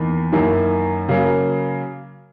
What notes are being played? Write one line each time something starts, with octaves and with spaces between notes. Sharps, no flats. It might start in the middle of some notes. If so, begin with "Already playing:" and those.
Already playing: E2 D#3 A#3 B5
F#2 D#3 A#3 E4
C#3 F#3 A#3